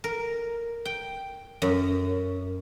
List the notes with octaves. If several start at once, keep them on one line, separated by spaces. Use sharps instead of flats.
A#4
G5
F#2